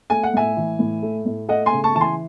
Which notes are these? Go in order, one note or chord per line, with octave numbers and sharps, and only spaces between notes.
A3 G#5
F#5
A2 E5 G#5
E3
A2
A3
A2
A3 D#5 F#5
G#5 C6
C#3
A5 C#6
E3 A5
G#5 C6